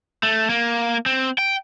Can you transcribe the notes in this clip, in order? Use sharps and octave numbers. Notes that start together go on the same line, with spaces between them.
A3
A#3
C4
G5